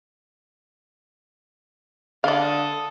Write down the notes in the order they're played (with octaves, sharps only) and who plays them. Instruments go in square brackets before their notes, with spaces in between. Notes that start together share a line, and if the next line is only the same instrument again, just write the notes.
[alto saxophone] D3 [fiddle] A4 D#6 [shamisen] D5 F5